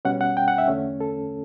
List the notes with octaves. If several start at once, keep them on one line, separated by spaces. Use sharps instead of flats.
B2 G3 C#4 F#5
F#5
G5
F#5
E5
E2 D3 A3 C#4
A4